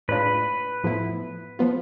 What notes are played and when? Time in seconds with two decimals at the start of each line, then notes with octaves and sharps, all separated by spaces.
0.08 A2 G#3 D4 F4 B4
0.84 A2 F3 B3 E4
1.59 F3 B3 F4